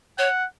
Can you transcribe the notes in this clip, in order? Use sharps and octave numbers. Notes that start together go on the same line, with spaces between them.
C#5 F#5